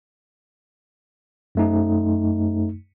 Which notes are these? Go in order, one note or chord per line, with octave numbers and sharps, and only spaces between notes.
F#2 A3 D#4